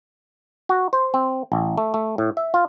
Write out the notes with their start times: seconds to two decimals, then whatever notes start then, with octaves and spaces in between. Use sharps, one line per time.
0.69 F#4
0.93 C5
1.14 C4
1.52 A1
1.78 A3
1.94 A3
2.18 A2
2.37 E5
2.54 F4